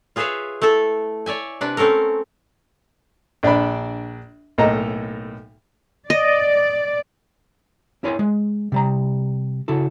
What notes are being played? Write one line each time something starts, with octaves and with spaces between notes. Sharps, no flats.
F4 G#4 B4 C#5 E5 F5
A3 E4 A4 E5
C#5 D5 E5 G#5
C3 D4 B4
A3 C4 C#4 A4 A#4
A#1 D4 D5 B5
B1 A2 A#3 A4 D#5 A#5
D5 D#5
C4 E4 A#4 C#5 G#5 C6
G#3
C3 G3 A#5
C#3 E4 F#4 A4